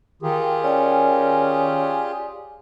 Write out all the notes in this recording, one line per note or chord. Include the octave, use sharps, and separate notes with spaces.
D#3 F4 G4 G#4
C#4 D5 G#5